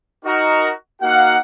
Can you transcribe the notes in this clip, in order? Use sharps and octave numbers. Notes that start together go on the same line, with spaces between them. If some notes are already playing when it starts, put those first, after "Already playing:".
D#4 F#4 A#4
A#3 D#4 F#4 F5 F#5